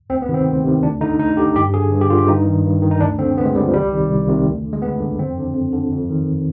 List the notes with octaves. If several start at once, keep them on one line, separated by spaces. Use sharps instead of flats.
D2 C4
B3
C3 D#3 C4
D2
C3 D#3
D2 D4
D3 D#4
D2 D#4
D3 G4
G2 G4
D3 G#4
G2
G4
D3 F4
G4
G2 D#4
D#3
G2
D#3
D#4
D2 D4
D3 C4
D2 B3
G#3
D3 G3
F3
C2 G3
C3 D#3
C2
C3 D#3
D2
D3
G#3
D2 B3
D3
F2 C4
D3
F2
D3
F2
D#3